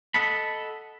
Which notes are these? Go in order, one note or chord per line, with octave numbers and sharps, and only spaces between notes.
A4 D#5 F#5 A5 B5